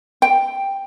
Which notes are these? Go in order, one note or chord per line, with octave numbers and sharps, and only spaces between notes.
G5